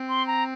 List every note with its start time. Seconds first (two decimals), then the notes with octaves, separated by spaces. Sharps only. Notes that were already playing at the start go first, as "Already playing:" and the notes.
Already playing: C4
0.09 C6
0.27 A#5